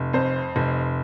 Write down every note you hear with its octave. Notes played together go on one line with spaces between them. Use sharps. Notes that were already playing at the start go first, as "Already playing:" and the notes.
Already playing: F1
F2 C5
F1